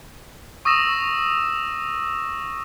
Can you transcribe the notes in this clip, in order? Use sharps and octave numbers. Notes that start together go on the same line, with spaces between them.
C#6 D#6 E6 A#6 E7